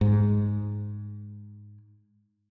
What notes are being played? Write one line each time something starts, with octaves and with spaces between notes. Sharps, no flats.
G#2